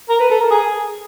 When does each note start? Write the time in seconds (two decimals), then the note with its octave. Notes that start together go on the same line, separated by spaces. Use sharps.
0.09 A#4
0.20 B4
0.30 A4
0.40 A#4
0.51 G#4